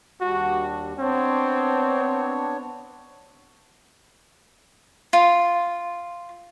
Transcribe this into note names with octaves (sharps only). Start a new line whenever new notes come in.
D#2 G3 D4 F#4
B3 C4 D4 C#5
F4